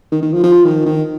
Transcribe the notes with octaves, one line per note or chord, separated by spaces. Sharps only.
D#3
D#3
F3
F3
D#3
D#3